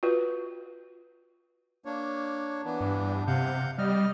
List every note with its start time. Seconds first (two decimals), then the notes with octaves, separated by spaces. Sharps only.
0.03 F4 F#4 B4
1.85 A#3 D4 C#5
2.65 E3 B3 D4
2.81 G2
3.28 C3 F5 F#5 G6
3.78 G3 D#5 F6